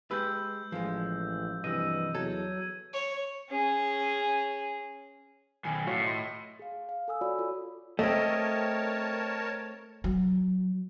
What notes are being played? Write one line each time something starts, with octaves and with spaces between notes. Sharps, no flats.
G#3 G4 B4 E6 G6
A1 F3 G#3
G2 C3 E3 D#5 E6 D#7
E2 F#3 A4 G#6
C#5
C#4 G#4
B1 D#3 G#5
A2 F4 F#4 C#5
D#5 C6
G#4 F5
F5
A4 G#5 D#6 E6
F4 F#4 C#5 D5 B5
F4 A4
A3 C4 A#4 C#5 D#5 A5
F#3